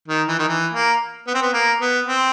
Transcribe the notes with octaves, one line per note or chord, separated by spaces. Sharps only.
D#3
E3
D#3
E3
A#3
B3
C4
B3
A#3
B3
C4